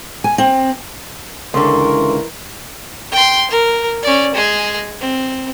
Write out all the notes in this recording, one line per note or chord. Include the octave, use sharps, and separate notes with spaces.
G#5
C4
C#2 D3 E3 A#4 C6 C#6
G5 C6
A#4
C#4 D5
G#3 G#4
C4